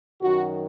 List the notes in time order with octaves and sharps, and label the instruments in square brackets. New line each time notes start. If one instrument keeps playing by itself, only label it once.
[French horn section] F#2 D#3 F#4